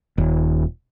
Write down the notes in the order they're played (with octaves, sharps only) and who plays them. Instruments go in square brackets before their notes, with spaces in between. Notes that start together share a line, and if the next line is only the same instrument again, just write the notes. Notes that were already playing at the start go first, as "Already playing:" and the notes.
[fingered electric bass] D#1